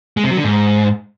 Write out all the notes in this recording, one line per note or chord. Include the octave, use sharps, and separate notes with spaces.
G#3
C3
F#3
D3
G#2